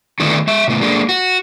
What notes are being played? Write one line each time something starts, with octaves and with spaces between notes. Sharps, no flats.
D3 D#3 A3 B3 D4 E4
G#3 E5
C3 A3 B3
G#3 A#3 D4
F#4